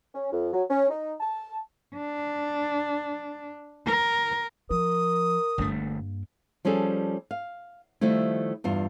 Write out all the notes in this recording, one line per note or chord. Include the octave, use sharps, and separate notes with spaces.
C#4
F2
F#3
C#4
D#4
A5
D4
A#4
F3 A#4 D#6
G1 G2 A3 A#3
F3 G3 C#4 G#4 A4
F5
D#3 F3 G3 A3 E4
E2 G2 F4